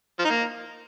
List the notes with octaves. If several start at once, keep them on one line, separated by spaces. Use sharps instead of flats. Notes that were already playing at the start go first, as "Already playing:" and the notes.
F3
D#4
A#3